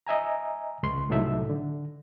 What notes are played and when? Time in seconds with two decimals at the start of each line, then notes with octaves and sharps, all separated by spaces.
0.07 D#5 E5 G#5 A#5
0.83 C#2 C6
1.09 C2 A2 F#3 D#4 A4 E5
1.50 D3